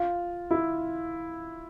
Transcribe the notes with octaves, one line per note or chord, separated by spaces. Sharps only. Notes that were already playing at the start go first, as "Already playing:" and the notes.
Already playing: F4
E4